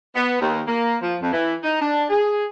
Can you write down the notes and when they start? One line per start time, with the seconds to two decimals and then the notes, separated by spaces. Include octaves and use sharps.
0.16 B3
0.41 D#2
0.67 A#3
1.02 F3
1.21 F2
1.32 E3
1.63 D#4
1.81 D4
2.09 G#4